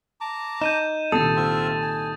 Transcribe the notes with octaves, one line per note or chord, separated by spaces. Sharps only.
A5 A#5 D6
D#4 G6 D#7 E7
C2 A#2 D#3 A4 D#6 E6 A6
C4 F4 E5
G#5